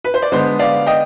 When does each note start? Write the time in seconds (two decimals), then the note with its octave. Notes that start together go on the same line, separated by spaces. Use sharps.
0.04 B4
0.14 C5
0.22 D5
0.32 D3 G#3 B3 C5 D#5
0.59 D5 F5
0.86 D#5 G5